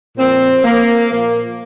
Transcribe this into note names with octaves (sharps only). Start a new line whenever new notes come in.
A#2 F3 C4
A#3
A#2 F3 A#3